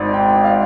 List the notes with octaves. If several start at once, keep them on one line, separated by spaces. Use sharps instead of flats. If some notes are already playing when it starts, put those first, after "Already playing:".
Already playing: G#1 G#2 D5
G5
G5
F5